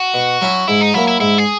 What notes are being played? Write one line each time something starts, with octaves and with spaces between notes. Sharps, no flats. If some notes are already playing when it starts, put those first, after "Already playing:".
Already playing: F#4
B2
F#3 C#4 E4
G#2 E4
D#4
F#3 A#3 E4
E4
G#2 E4
G#4